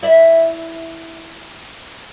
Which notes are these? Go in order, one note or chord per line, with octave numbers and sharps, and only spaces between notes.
E4 D5 E5